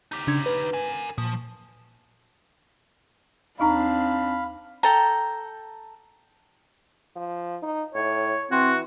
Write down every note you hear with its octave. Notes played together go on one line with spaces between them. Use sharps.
D#4 G4
C#3 D4 G#6
B4
A#4 G#5
A#2 F3
D#2 C4 D4 D#4 F5 A#5 B5
A4 G5 A#5
F3
D#4
A2 C#5
E3 C4 F#4